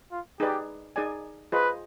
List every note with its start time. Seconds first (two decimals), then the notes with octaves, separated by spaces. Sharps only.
0.11 F4
0.40 D#4 G4 G#4 B4 D5
0.96 D#4 G#4 D5 G#5
1.52 F4 G#4 B4 C5 D#5